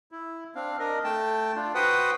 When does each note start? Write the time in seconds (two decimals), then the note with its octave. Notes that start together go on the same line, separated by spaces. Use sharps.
0.11 E4
0.55 C4 D4 F5
0.79 D4 A#4 D#5
1.04 A3 G5 A5
1.56 D4 F4
1.75 F#4 B4 C5 F#5 G5 D#6